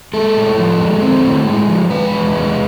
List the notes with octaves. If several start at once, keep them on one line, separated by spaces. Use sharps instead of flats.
G#3 A4
A2
F3
G#3
C4
A2
G#3
F3
G#3 B4
E2
G#3